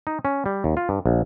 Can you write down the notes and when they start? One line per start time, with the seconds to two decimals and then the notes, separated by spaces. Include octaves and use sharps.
0.07 D#4
0.25 C#4
0.46 G3
0.64 D#2
0.77 F4
0.89 G2
1.06 A#1